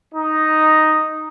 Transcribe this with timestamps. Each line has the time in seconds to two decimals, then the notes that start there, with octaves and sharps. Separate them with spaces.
0.13 D#4